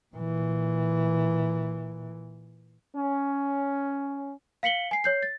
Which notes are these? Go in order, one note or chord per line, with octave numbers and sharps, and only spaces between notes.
A#2 E3
C#4
F5 B6 C#7 F#7 G7
G#5 C7
C#5 G6 C7
A6